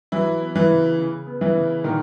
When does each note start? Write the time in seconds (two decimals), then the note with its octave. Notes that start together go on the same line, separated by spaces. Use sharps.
0.12 E3 F#3 E4
0.41 B3
0.55 E3 E4
0.69 C#3
0.98 C#3
1.27 B3
1.41 E3 E4
1.55 C#3
1.84 A#2 D#3 D#4